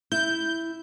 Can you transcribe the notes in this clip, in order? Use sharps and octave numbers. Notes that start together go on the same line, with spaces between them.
E4 G6